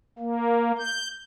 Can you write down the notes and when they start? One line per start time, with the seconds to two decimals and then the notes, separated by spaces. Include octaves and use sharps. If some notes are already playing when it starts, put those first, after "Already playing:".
0.19 A#3
0.78 G6